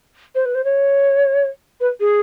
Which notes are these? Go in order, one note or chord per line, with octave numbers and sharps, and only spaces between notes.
C5
B4
C5
C#5
B4
G#4